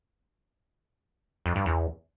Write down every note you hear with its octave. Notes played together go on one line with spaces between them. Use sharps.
F2
G2
E2